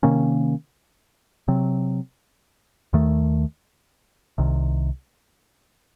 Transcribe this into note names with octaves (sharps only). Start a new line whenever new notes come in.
C3 D#3 A#3 C#4
C3 F#3 C4
D#2 D#3 A3
C2 C3 D#3